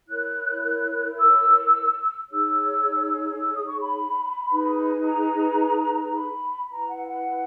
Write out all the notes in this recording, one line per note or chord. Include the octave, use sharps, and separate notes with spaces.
E4 A#4 C#5 F#6
E6
D#4 G#4 C#5 E6
E6
D#6
C#6
B5
D#4 G#4 B4
A#5
A#5
B5
E4 B4 A#5
F#5
F#5